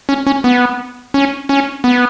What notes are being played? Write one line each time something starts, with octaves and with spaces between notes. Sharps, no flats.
C#4
C#4
B3
C#4
C#4
B3